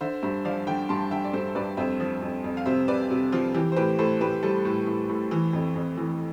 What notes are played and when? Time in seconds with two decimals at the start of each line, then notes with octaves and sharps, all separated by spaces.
0.01 D3 C5 E5
0.23 G2 C5 E5
0.45 F3 D5 F5
0.67 D3 E5 G5
0.89 G2 A5 C6
1.11 D3 E5 G5
1.24 D5
1.33 G2 A4 C5
1.55 G2 B4 D5
1.77 F2 C5 E5
2.00 F3
2.22 F2
2.44 F2
2.57 F5
2.66 C3 C5 E5
2.88 C3 B4 D5
3.10 C3
3.32 F3 F4
3.54 E3 G4
3.72 C5
3.76 A2 G4 B4
3.99 A2 A4 C5
4.21 A2 G4 B4
4.43 G3 A4 C5
4.65 A2
4.87 A2
5.09 A2
5.31 E3
5.53 F2
5.76 F2
5.97 E3